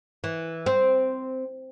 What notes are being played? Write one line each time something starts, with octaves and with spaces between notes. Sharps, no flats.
E3
C4